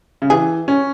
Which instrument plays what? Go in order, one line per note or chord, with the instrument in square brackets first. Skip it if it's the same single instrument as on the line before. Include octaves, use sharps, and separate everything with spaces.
[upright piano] C#3
[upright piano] E3 [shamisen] G#4
[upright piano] C#4